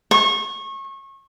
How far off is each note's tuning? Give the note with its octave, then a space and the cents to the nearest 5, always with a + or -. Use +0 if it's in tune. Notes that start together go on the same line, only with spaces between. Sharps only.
C#6 -30